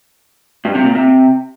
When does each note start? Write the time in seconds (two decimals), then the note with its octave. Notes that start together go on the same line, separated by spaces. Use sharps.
0.65 G2
0.75 C3
0.85 A#2
0.95 C3